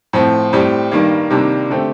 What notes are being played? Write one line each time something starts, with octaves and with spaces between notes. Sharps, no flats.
A2 F3 C4
A2 G3 C4 G4
G2 D#3 G3 A#3
C3 D#3 G3 A#3 D4
D3 A3 C4 G4